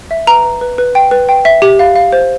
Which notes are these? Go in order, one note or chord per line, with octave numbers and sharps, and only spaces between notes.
E5
B4 A#5
B4
B4
B4
G5
B4
G5
E5
G4
F5
F5
C5